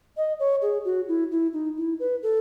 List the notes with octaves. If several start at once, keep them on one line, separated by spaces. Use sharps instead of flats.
D#5
C#5
G#4
F#4
E4
E4
D#4
E4
B4
A4